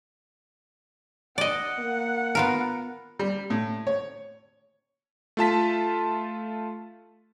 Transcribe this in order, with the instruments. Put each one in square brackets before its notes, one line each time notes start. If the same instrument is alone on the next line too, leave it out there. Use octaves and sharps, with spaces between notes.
[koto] D5 D#5 [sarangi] F#5
[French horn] A#3
[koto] B3 F4 A#4
[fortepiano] G3
A2
C#5
[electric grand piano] A3 F4 A5 B6